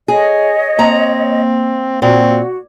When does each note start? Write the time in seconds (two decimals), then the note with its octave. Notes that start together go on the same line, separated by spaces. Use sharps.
0.08 G#4 C#5 D#5
0.79 A#3 C4 A#5
2.02 A#2 C4 F#4